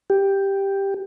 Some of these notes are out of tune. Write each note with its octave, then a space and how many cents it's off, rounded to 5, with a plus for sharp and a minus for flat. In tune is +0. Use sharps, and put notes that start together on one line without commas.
G4 +5